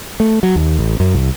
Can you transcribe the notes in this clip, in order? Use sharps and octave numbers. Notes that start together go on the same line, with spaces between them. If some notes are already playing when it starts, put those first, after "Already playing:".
A3
F#3
D#2
A1
F#2
C2